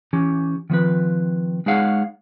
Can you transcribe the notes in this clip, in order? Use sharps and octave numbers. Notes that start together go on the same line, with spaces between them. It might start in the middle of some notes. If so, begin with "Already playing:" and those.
E3 C#4 G4
D#3 F3 C4 B4
G#3 D#4 G#4 C#5 F5 F#5